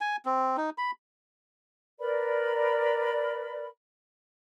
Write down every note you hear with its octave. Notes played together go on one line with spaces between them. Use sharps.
G#5
C4
D#4
B5
A#4 B4 D5 B5